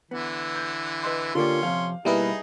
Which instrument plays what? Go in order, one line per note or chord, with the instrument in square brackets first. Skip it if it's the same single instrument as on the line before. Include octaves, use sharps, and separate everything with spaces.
[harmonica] D3 E3 [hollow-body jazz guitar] B3
[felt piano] G6
[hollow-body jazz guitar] B4 D#5 C6
[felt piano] D3 A#3 G4 [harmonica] C#4 C6 [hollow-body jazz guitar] F4 D5
[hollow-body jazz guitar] F2 C3 [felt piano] F5
[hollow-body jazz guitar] B2 A#3 [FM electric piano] G3 E4 B4 [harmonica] D#4 G#4